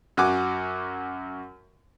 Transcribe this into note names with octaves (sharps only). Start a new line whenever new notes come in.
F#2 F#4 F#5 G#5 D6